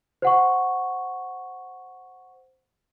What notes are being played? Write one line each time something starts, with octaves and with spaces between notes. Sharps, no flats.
C5 F#5 C#6